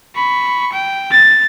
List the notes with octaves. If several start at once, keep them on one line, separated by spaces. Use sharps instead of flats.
B5 C#6
G5
A6